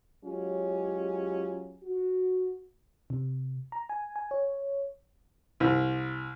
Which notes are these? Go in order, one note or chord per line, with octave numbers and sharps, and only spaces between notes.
F#3 G#3 C#4 F4 G4 G#4
F#4
C3
A#5
G#5
G#5
C#5
C2